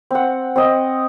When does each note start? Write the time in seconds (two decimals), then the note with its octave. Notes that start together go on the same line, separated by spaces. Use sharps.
0.11 C4 F#5
0.56 C4 D#5